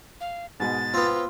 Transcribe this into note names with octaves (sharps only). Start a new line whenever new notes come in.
F5
G#2 B2 G#3 A6
B3 C4 F4